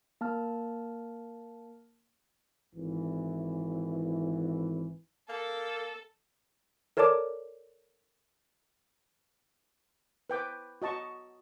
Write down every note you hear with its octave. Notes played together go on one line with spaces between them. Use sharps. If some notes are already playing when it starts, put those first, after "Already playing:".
A#3 A5 F6
G#1 E3
A#3 A4
A4 A#4 C#5 D5 A5 D6
B4 G5 D6
F#4 D#5 A5 C#6